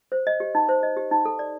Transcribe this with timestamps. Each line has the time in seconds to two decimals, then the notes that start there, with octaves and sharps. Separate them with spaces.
0.12 C5
0.27 D#5
0.40 G4
0.55 D#4
0.69 C5
0.83 D#5
0.97 G4
1.11 D#4
1.25 A4
1.39 D5